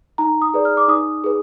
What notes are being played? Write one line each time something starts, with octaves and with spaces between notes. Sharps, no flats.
D#4 A#5
D#6
G#4 B4 D5
F6
D6
D#4 D#6
G#4 B4